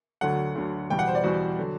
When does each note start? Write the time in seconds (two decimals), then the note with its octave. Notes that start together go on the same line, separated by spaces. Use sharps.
0.21 D2 D3 F#3 F#5
0.55 D2 D3 F#3
0.90 E2 B2 G3 G5
0.99 F#5
1.07 C5
1.15 D5
1.24 E2 B2 G3 F#4
1.59 D3 F#3